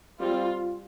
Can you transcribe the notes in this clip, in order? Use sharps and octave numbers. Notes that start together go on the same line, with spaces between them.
G3 C4 F4